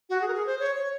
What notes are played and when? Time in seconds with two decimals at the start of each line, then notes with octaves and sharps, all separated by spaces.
0.10 F#4
0.21 G#4
0.28 A#4
0.34 G#4
0.47 C5
0.59 C#5
0.75 C#5